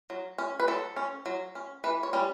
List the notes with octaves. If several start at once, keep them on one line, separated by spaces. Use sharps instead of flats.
F#3
C#4
B4
F#3 A4
C#4
F#3
C#4
E3 B4
C#5
G3 C#4